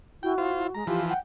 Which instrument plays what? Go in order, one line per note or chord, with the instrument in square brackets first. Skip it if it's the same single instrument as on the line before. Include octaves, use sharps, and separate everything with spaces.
[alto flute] E4 [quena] F#4 [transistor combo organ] G5
[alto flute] E4 [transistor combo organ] F4 C5
[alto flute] E4
[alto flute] G#3 [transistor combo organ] A#5
[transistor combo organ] E3 F3 [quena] F4 [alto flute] G4
[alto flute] F#5 [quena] G5